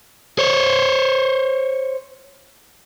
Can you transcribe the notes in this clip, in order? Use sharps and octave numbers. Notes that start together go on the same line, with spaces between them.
C5 C#5